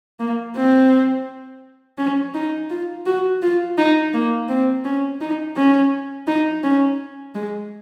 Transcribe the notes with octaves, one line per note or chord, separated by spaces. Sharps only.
A#3
C4
C#4
D#4
F4
F#4
F4
D#4
A#3
C4
C#4
D#4
C#4
D#4
C#4
G#3